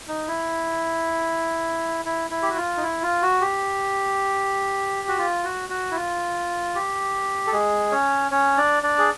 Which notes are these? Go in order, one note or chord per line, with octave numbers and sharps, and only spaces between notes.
D#4
E4
E4
E4
G4
F#4
F4
D#4
E4
F4
F#4
G4
F#4
F4
F#4
F#4
E4
F4
G4
A4
G#3 G#4
C#4 C#5
C#4 C#5
D4 D5
D4 D5
G#4